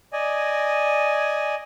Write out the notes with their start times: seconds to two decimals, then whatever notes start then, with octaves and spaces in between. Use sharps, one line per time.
0.13 D5 D#5 G#5